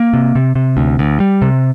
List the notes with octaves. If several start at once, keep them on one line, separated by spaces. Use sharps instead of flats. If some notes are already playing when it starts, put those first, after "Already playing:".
Already playing: A#3
C3
C3
C3
D2
D2
G3
C3